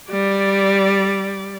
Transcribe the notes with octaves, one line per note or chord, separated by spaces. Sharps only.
G3 D5